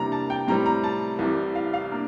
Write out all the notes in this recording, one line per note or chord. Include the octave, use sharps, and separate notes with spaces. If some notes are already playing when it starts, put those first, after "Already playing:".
Already playing: C3 E3 G3 A#3 D4 A#5
A5
G5
A2 G3 C4 A#5
A#5
A5
C2 C3 E3 G3
F5
F5
A#3 D4